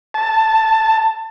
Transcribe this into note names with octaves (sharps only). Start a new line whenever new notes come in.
A5